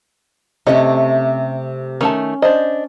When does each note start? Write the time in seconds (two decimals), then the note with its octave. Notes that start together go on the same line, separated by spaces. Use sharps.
0.67 C3 A3 C#4 D#5
2.01 D#3 A3 C#4 A5
2.42 D4 C5 D#5